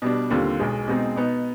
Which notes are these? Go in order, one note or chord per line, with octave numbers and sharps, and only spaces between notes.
B2 G3 D4
D#2 D3 G3 C4 F4
B1 B2 G#3
B2 G#3 C4 D#4
B2 B3 D#4